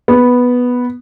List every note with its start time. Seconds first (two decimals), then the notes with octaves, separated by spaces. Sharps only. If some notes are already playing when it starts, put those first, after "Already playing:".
0.08 B3